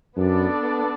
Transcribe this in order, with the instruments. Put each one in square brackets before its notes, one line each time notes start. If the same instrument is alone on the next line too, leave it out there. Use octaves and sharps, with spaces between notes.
[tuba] F#2 [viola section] B3 D4 A4 D5